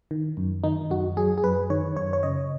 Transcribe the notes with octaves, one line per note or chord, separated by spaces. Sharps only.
D#3
F#2
D#3 D#4
F#2 F#4
F#3 G#4
G#4
F#2 B4
D#3 C#5
F#2 C#5
C#5
C#3 D#5